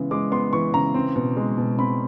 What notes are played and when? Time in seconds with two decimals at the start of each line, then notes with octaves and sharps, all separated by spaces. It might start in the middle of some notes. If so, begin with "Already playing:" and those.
Already playing: C#3 E3 G#3 B3
0.11 G#3 D6
0.32 B3 C6
0.53 E3 C#6
0.74 C#3 A#5
0.94 C4
1.16 B2
1.37 G#3
1.58 B2
1.78 C4 B5